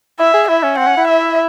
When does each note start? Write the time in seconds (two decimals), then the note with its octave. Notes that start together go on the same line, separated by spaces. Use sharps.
0.19 E4 E5
0.34 G#4
0.48 E4 E5
0.63 C#4
0.78 C4 F#5
0.87 C#4
0.97 E4
1.08 E5